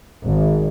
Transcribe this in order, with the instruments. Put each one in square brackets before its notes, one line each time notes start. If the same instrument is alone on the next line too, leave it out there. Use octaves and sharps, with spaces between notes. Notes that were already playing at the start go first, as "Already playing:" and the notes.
[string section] G#1